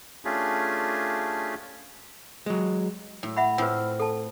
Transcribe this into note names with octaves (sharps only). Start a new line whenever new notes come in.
A3 C#4 D4 F4 G4 G#4
F#3 G#3
A2
E5 F#5 B5
A2 C4 F4 B4
A4 A5